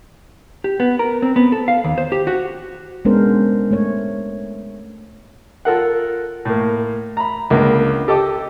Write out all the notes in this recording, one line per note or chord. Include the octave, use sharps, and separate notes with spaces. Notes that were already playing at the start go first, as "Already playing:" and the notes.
G4
B3
A#4
C4
B3
A4
F5
D#2
C5
G4
F#4
G#3 B3 C#4 D4 A#4 C5
A3 C#5
F4 A4 A#4 F#5
A2 A#3
A#5 B5
C#2 D3 A#3
G4 A4 D#5 D6